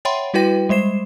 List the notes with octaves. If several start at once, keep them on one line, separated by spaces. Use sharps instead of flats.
C#5 E5 F#5 G5 B5 C6
G3 E4 F#4 B4 G5 A#6
G3 G#3 C5 C7 E7